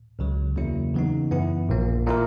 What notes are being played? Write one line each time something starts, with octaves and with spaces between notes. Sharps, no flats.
C#2 C#3 F#3
E2 C#3 F#3 A#3 E4
C#3 E3 B3 D#4
F#2 E3 B3 E4
A#1 A#2 A#3
A#2 A#3 E4 A#4